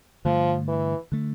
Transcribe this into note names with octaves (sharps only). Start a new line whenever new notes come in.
G2 D3 F3 A3
E3
D3 A3